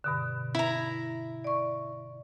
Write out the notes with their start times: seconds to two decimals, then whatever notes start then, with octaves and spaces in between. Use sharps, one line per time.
0.04 G2 B2 D3
0.55 E4 A#5
1.44 D5 C#6